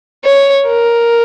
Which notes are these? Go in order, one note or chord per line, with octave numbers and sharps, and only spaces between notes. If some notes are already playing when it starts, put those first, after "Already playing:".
C#5
A#4